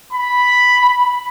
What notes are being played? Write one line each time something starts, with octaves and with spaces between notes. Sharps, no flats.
B5